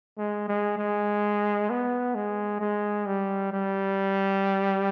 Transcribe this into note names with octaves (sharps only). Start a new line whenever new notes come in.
G#3
G#3
G#3
B3
G#3
G#3
G3
G3